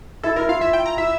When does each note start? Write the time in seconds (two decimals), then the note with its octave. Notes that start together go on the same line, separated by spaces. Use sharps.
0.23 E4 A4
0.36 E4 A#4
0.49 F4 F5
0.61 E4 E5
0.73 G5
0.86 A#5
0.98 E4 E5